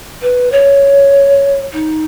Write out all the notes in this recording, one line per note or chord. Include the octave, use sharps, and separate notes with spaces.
B4
C#5
D#4